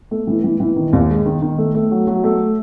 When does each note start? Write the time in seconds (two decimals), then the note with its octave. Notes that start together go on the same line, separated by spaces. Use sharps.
0.11 A3
0.27 E3
0.44 E3
0.60 E3
0.76 D#3
0.93 D#2
1.09 G#3
1.25 D#3
1.42 D#3
1.58 A3
1.75 A3
1.91 F#3
2.07 F#3
2.24 A3